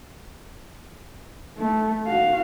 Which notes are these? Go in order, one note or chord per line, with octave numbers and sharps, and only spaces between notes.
A3
F#4 F5